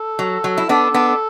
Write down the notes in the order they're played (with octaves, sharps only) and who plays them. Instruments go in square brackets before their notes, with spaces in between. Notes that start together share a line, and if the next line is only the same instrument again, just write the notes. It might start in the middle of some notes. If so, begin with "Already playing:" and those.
Already playing: [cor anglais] A4
[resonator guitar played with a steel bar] F#3
F#3
E4
[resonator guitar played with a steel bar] B3 D4 [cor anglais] A4
[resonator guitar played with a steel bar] B3 D4
[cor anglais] A4